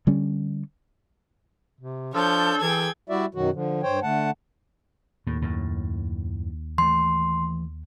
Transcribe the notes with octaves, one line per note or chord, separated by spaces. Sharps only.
D3 G3 C#4
C3
F3 D4 A4 C#5 G6
E3 G#4 G5 G#6
G3 E4 F#4 D5 E5
F#2 B2 D#3 F#3 F#4
D3 F3
G2 C5 C#5 G5
D3 A3 F#5 A5
D#2 A2
F#2 A2
E3 A3 C6